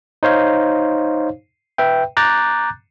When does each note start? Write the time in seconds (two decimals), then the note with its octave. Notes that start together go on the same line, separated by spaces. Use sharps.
0.23 D#4 C5 C#5 F5
1.78 B4 E5 G5
2.17 A#5 D6 F#6 G6 A6